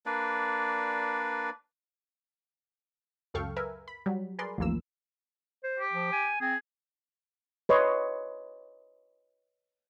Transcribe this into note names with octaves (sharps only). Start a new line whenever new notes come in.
A#3 D4 B4 D5
C#2 F#2 A4 F5 G5 C#6
A#4 B4 E5 G#5
B5
F#3 G3
G#4 A#4 B4 D5 C6
A1 D#2 F3 A#3 E6
C5
G4
F3
G#5
C4 G#4
B4 C#5 D#5 C6